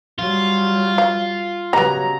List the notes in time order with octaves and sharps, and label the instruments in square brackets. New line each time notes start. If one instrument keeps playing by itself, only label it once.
[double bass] F#3 G3 [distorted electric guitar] F4
[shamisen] F5
[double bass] C#3 F#3 [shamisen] G3 B3 [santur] A#5